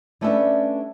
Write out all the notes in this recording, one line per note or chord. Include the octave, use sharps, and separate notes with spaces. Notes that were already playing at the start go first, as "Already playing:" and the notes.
G3 A3 C#4 D4 B4 E5